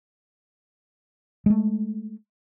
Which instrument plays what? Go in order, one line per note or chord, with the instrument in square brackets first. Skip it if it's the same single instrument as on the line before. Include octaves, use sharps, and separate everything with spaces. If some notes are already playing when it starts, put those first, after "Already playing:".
[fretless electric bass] G#3 A3